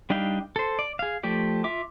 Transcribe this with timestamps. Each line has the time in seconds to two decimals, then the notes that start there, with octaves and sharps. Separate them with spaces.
0.10 G3 D4 D#4 F5 G5
0.56 A4 C5
0.79 D5
0.99 G#4 F5
1.23 F3 A3 G4 D5
1.64 F4 E5 D6